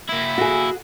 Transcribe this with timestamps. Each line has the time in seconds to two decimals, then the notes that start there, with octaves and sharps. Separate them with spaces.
0.09 A#3 E4
0.38 F#4 G#4